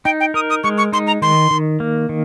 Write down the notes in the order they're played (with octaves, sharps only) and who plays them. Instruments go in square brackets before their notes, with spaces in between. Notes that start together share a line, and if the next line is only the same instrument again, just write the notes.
[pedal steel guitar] D#4 [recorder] G5
[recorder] G5
[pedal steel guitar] A#4 [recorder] D#6
[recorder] D#6
[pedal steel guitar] G#3 [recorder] C#6
[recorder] C#6
[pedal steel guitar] D#4 [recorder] C6
[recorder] A#5
[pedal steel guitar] D#3 [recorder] C6
[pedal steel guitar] D#3
A#3
D#3